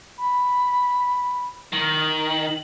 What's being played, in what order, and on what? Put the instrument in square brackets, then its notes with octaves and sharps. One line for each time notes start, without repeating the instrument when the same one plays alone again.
[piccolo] B5
[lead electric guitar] D#3 [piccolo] F#7